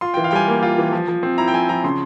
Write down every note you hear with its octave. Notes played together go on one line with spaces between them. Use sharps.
F4 C6
E3 G5
F5
G3 G5 G#5
A#3
F4
E3
F3
F3
C4
E4 A#5
G5
F3 G#5
F3 A#5
C#3 C6